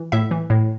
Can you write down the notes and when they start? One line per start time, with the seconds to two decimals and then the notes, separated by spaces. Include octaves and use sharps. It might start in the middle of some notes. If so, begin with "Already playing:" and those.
Already playing: E3
0.12 A2 E5
0.31 E3
0.50 A2